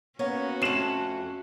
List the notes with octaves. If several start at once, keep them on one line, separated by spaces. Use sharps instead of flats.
A#3 B3 C#4 F#4 C#5
F2 A3 C7 E7 F#7